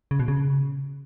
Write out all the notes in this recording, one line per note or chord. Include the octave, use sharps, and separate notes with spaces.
C#3
B2
C#3